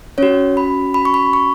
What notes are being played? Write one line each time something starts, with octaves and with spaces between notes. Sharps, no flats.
C#4 F#4 C#5
B5
B5
C#6
B5
C#6